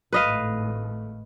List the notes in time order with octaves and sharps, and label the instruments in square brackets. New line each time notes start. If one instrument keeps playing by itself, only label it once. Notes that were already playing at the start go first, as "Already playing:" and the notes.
[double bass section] G#1 A2 A3 [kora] B4 D#5 F5